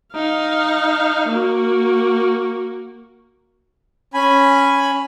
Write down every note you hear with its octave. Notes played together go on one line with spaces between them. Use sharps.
D#4 F5
A#3 F#4
C#4 G#5 B5